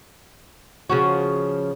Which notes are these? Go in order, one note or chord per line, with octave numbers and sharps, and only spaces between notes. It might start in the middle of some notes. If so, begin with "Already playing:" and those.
C#3 F3 F#4